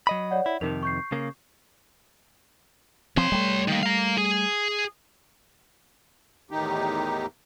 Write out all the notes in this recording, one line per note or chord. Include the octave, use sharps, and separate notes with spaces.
F#3 D#5 B5
C#5 D5 F#5
E4
F2 C3 D#3 D#4 A#4 F7
C#6 G6 C7
C#3 A#3
F3 C4 C#5 C6
G3 A3
D#3 A#3
F5 A#5
G#4
E2 A2 D#3 D#4 G4